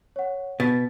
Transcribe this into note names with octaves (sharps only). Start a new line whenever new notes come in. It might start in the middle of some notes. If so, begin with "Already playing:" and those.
C#5 F#5
B2 A6 B6